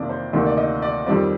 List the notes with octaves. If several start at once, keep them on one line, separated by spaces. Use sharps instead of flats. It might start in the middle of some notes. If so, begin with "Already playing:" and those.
Already playing: F2 C3 D#3 A#3 D5
C5
D2 C3 D#3 A#3 D5
D5
D#5
D5
F2 D#3 G3 C4 D5